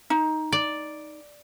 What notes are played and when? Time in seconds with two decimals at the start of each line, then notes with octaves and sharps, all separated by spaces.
0.10 D#4
0.52 D5